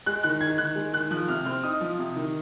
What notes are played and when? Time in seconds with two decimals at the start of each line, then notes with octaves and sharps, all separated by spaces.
0.06 G#3 F#6
0.23 D#3 F#6
0.41 D#4 G#6
0.58 D#3 F#6
0.75 G#3
0.93 D#3 F#6
1.11 F3 F#6
1.28 C3 F6
1.45 C4 F6
1.64 D#4 D#6
1.81 F3
1.99 C3
2.16 D#3